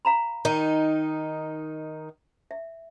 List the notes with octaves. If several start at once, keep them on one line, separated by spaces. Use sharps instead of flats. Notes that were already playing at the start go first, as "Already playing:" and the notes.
F5 A#5 B5
D#3 D#4
E5